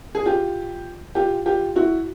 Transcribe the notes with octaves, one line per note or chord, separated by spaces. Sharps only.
G#4
F4 G4
F4 G4
F4 G4
E4 F#4